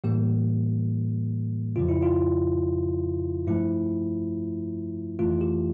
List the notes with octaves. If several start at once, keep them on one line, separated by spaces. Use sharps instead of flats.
A2 E3 G3 A#3 G4
F2 C#3 F3 F4
E4
F4
G2 F3 A3 E4
F2 E3 A3 F4
G4